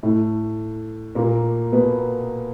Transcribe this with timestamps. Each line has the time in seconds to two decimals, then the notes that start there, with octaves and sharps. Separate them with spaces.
0.03 A2 A3
1.15 A#2 A#3
1.72 B2 B3